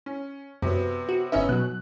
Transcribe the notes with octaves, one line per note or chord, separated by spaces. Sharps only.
C#4
F#2 C3 F#3 B3
F#4
G1 B3 C#4 D#4 E5
B2 F#3 F#6